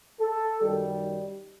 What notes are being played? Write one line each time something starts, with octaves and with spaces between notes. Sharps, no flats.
A4
F#2 D#3 G3